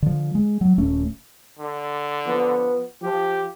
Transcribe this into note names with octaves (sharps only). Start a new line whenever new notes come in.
D3 F3
G#3
F#3
D#1 A3 C#4
D3
F3 B3
F3 G4